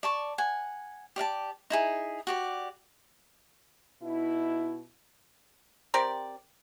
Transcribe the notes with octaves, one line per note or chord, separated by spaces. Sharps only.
D5 A5 C#6
F#5 G#5
G4 D5 F5 A5
D#4 E4 G#4
F#4 G4 D5
B2 D#4 E4
C4 G4 A#4 D5